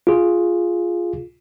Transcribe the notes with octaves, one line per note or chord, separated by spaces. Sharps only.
F4 G#4